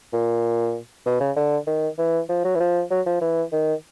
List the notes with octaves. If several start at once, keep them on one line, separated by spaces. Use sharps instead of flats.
A#2
B2
C#3
D3
D#3
E3
F3
F#3
E3
F3
F#3
F3
E3
D#3